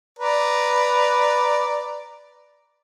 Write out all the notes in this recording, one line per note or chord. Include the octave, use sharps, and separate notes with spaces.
B4 D5 A#5